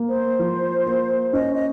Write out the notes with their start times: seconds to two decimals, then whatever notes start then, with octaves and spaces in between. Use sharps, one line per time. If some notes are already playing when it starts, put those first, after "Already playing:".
Already playing: A#3
0.08 C5
0.39 F3
0.86 A#3
1.33 C#4 D#5
1.53 D#5